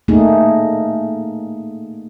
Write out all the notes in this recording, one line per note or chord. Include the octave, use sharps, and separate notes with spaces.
A3 A#3 D#4 G#4